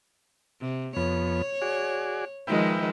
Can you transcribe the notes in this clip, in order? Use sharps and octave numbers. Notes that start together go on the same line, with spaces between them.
C3
F2 B3 C#5
F#4 G#4 D5
D#3 F3 G#3 B4 E5 G5